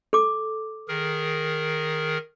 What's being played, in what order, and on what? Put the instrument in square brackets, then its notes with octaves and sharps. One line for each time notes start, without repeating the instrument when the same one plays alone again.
[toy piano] A4 D6
[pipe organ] D#3 G#4 A#4